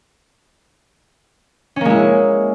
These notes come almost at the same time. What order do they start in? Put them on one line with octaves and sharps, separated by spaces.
C#4 A#3 G#3 E4